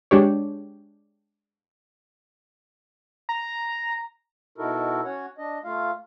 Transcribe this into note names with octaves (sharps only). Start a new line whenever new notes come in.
G#3 D4 G4 C#5
A#5
B2 D#4 E4 F#4 A4 A#4
C#4 F#4 C#5 F#5
D4 D#5
A3 F4 F5